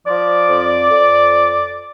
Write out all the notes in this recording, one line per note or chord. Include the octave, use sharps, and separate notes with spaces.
F3 D5
F2
F2